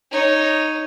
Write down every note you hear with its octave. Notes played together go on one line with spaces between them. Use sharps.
D#4 C#5